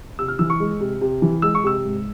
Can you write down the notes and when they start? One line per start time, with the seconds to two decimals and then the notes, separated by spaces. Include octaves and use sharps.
0.19 C3 E6
0.28 F6
0.39 E3 E6
0.50 C#6
0.60 G#3
0.80 C3
1.01 C3
1.22 E3
1.42 G#3 E6
1.55 C#6
1.64 C3 E6
1.84 G#2